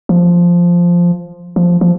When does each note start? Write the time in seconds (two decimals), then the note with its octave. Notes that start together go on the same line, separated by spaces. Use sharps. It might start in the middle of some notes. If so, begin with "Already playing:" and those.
0.09 F3
1.56 F3
1.81 F3